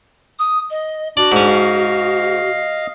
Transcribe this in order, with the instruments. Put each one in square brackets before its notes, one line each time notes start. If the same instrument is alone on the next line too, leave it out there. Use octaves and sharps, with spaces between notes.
[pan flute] D#6
D#5
[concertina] D4 [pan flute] F#4 [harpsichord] D5
[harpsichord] G#2 C#4
[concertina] D#5 F5